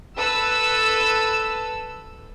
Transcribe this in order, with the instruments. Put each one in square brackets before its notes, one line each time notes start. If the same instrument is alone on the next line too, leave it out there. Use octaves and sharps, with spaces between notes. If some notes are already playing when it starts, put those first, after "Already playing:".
[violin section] A4 B4 E6